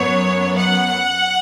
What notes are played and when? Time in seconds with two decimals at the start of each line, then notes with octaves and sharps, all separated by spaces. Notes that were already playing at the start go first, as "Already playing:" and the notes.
Already playing: F#2 F#3 B3 C#5
0.56 F#5